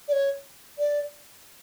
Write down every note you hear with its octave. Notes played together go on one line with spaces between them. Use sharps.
D5
C#5
D5